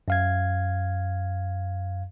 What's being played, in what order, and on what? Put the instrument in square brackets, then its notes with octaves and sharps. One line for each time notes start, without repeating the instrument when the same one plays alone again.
[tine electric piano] F#2 F5 G#6